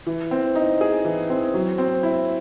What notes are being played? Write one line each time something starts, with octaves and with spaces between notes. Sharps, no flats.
E3
C4
D#4
G#4
E3
C4
F#3
C4
E4